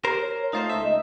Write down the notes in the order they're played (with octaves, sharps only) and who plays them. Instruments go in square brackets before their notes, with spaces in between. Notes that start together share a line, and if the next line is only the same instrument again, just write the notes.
[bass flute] G4 [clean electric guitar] A#4 C5
[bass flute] C#5
[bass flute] A3 [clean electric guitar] D#4 F4 C5
[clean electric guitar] C#2 D#4 E5
[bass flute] D#5